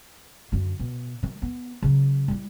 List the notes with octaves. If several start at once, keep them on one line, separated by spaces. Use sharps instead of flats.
F#2 D3
B2
D#3 F#3
B3
C#3 F#3
G3 E4